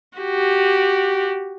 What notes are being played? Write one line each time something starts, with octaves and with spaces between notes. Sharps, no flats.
F#4 G4